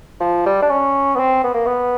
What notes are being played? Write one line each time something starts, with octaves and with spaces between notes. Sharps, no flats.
F3
G3
D4
C#4
B3
C4
B3
A#3
B3